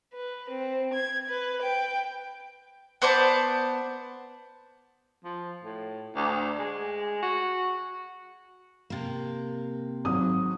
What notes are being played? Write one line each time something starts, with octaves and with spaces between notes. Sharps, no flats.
B4
C4
G#6
B4
G5
B3 C5 D5 A5
F3
A2
D2
G#3
F#4
C3 A#3
G#1 F#3 D#6